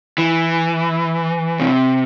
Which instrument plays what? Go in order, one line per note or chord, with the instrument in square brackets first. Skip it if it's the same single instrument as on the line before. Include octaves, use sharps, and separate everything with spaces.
[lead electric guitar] E3
C3